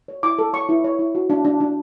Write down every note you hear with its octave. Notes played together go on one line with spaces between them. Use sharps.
C#5
E4 D6
A4
C#5 C#6
E4
C#5
E4
F#4
D4
D4
D4